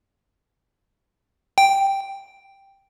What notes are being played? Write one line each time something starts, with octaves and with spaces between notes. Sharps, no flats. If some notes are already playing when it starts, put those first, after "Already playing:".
G5